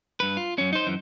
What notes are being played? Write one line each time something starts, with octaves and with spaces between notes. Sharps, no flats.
G2 B4
F4
F#2 C#4
D#4 C5
F#2 E3